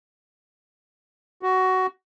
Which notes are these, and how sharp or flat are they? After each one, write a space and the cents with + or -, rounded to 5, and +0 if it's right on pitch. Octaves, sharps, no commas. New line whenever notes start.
F#4 +15